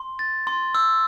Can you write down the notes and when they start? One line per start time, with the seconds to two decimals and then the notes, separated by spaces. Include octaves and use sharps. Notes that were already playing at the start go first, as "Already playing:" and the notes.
Already playing: C6
0.19 A6
0.47 C6
0.75 E6